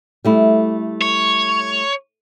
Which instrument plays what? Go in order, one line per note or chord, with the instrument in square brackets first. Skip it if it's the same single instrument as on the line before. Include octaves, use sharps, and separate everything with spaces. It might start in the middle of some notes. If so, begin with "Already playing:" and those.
[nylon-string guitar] G3 A3 E4
[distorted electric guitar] C#5